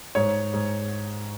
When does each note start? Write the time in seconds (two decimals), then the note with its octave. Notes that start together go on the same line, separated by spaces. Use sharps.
0.15 G#2 C#5
0.53 G#2